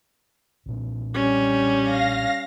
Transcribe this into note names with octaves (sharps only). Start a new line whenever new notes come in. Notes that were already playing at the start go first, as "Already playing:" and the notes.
B1 A#2 C4
G3 C#4
F5 A#6